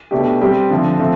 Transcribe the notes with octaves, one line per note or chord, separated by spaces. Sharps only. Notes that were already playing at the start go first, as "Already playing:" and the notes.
B2 A3 D4 G4
G3 C4 G4
D3 F3 A3 C4
F3 A3 C4